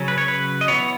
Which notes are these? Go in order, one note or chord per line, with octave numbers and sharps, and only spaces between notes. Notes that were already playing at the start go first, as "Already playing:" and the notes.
Already playing: C#3 F#3 C#4
B4
C#5
B4
D#5
E3 B3 C#5